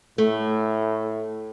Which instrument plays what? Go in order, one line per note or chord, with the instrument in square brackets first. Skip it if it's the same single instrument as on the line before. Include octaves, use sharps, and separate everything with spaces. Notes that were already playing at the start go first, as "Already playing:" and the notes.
[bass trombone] A2 [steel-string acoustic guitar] A3